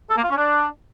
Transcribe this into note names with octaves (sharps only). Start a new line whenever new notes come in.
A4
A#3
F4
C#4
D4